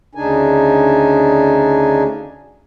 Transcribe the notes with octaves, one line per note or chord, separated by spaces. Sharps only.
D2 C#3 D4 D#4 G#5